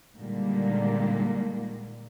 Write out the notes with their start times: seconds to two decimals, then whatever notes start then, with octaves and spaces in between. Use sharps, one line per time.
0.17 A#2 D3 D#3 G3 G#3 A#3